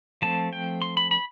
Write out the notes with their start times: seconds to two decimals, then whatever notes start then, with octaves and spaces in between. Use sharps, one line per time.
0.22 F3 A3 C4 A5
0.53 G5
0.82 C6
0.97 B5
1.11 B5